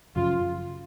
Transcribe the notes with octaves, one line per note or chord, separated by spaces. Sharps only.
F#2 C#3 F3 F4